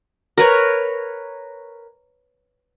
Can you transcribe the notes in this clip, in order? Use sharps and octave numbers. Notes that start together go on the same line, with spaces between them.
A#4 B4 C#5